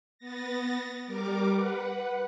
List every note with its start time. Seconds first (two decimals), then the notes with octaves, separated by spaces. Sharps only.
0.18 B3 A6 A#6
1.06 G3 A#4 D6
1.52 B4 F#5